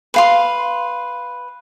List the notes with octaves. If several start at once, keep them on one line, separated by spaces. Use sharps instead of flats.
B4 F5 C6